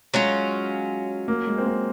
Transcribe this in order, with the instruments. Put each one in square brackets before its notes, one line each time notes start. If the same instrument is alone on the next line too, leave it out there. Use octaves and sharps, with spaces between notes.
[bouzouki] F#3 C#4 F4 [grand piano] G#3
[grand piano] A#3
G#3
C4
A#3